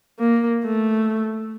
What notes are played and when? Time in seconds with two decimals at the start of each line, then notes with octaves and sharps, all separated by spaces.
0.19 A#3
0.65 A3